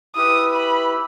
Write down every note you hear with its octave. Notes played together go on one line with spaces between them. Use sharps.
E4 G4 B4 D#6
B5